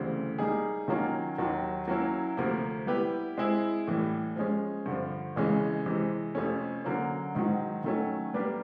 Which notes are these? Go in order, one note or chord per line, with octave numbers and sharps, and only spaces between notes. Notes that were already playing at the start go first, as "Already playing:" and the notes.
Already playing: D2 C#3 E3 G3 C4
G3 A#3 D#4 G#4
D#3 F#3 A#3 C#4 F4
D#2 D#3 F#3
F#3 A#3 C#4 E4
D2 C3 F3 A#3
G3 B3 E4 G4 B4
G#3 C4 E4 G#4
A2 E3 G3
F3 G#3 C#4
G2 D3 F3
F2 C#3 E3 G#3 C#4
C3 E3 G#3
F2 C3 F3 A3 C#4
D3 F#3 A#3 C#4
G#2 D#3 F#3
D#3 F#3 A3 C#4
G3 A#3 D4 G4 B4